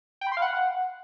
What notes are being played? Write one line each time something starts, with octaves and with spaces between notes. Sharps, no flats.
G5
B5
C6
F5
F#5